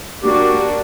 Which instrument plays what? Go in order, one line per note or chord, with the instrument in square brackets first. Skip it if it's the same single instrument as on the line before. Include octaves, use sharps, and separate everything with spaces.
[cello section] A#3 D4 F#4 [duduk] G4